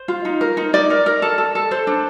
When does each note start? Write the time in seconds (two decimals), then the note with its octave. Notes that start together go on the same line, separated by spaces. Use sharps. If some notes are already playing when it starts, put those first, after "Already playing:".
Already playing: C5
0.08 F4
0.25 D#4
0.41 A#4
0.57 D#4
0.73 D#4 D5
0.90 A#4
1.06 A#4
1.22 A4
1.38 A4
1.55 A4
1.71 A4 C5
1.87 D4